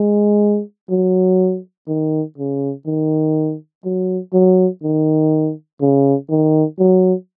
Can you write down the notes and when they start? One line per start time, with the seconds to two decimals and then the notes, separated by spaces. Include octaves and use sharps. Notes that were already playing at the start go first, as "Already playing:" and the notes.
Already playing: G#3
0.90 F#3
1.88 D#3
2.38 C#3
2.86 D#3
3.85 F#3
4.33 F#3
4.83 D#3
5.81 C#3
6.30 D#3
6.79 F#3